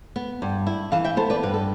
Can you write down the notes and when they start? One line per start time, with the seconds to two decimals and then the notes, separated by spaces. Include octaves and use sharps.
0.16 B3
0.42 G2
0.67 E4
0.92 E3 F5 A5
1.04 E5 G5
1.17 B3 A4 C5
1.30 B4 D5
1.43 G2 B4
1.54 A4